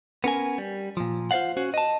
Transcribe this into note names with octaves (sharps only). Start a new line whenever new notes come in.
B3 C#4 A#4 G#5
G3
A#2 F3
F4 C5 D5 F5 F#5
C#4 F#4 C5
D#5 A5